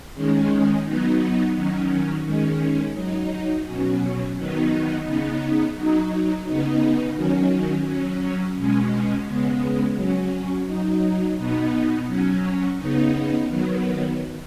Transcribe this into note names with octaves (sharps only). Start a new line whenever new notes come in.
D#3 G#3 C#4
F#3 B3 D#4
D#3 F#3 C#4
D#3 G#3 C#4
F#3 D#4
B2 F#3 C#4
D#3 F#3 B3 D#4
C#3 B3 D#4
F#3 D#4
C#3 B3 D#4
D#3 F#3 C#4
F#3 C#4
B2 G#3 C#4
C#3 G#3 B3
F#3 C#4
F#3 D#4
B2 B3 D#4
F#3 C#4
C#3 B3 D#4
D#3 F#3 B3